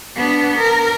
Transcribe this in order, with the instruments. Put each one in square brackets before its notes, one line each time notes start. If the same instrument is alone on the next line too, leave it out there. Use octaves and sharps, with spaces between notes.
[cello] B3 D4
A#4